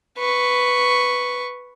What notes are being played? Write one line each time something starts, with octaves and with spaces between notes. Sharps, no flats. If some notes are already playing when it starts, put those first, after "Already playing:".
B4 C#6